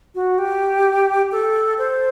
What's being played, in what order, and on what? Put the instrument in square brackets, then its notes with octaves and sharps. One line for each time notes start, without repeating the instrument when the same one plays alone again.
[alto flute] F#4
G4
A4
C5